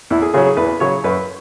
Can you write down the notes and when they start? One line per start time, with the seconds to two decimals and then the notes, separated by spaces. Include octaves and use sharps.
0.10 E2 E4
0.22 G#4
0.33 C#3 F#3 G#4
0.46 G#4
0.57 E2 B4
0.80 C#3 F#3 C#5
1.04 F#2 B4